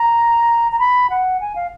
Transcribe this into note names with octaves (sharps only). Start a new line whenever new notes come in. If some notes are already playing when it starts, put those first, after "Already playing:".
Already playing: A#5
A#5
B5
F#5
G#5
F5